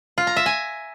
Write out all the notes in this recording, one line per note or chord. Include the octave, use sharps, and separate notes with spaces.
F4
A#5
E5
G#5